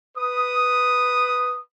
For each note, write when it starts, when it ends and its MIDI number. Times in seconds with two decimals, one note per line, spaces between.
0.17 1.59 71
0.17 1.59 87